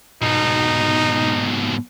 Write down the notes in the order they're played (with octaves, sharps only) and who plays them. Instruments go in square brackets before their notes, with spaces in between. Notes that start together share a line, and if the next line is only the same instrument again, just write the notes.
[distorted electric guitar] G#2 B2 [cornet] D#4